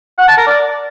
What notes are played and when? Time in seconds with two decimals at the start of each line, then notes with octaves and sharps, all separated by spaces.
0.18 F#5
0.28 A5
0.37 A#4
0.47 D5